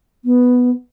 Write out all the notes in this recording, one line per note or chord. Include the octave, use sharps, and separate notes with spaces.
B3